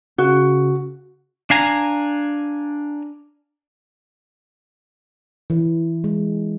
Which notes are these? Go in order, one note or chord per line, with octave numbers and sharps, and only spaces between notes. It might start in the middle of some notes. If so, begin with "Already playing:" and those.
C#3 F#4
D4 F5 G#5 A#5
E3
G#3